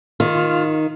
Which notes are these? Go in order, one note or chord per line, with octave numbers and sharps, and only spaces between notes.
D#3 F4